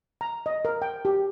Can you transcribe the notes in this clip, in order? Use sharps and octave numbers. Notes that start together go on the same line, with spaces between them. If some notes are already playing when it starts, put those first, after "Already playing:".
A#5
D#5
A#4
G5
G4